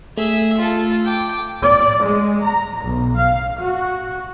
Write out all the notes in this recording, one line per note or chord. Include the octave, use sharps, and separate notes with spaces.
A3 G#4 E5
F4 A4
G5 D6
D5
G#3
A#5
B1
F5
F#4